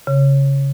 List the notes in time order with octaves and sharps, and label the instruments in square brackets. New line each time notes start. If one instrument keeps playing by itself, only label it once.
[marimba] C#3